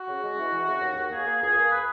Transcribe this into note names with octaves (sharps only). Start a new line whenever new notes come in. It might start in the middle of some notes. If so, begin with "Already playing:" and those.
Already playing: F#4
C#3
G#3
E3
E3
C#3
D#2
D#2
A#3 G#4
A#3
C#2 G#4
A#3
B4